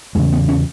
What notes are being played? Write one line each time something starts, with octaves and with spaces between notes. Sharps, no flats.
E2 C#3 G#3
B3
C#4